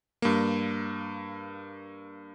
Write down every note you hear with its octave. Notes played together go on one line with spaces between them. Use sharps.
G2 A#3